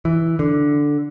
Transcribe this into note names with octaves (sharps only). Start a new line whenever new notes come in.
E3
D3